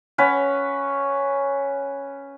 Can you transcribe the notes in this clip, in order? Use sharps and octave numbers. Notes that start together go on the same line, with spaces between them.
C#4 B4 C#5 F#5